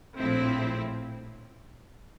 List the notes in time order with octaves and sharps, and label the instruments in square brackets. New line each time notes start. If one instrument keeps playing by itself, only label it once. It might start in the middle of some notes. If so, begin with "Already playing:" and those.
[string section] A#1 A2 F3 C4 E4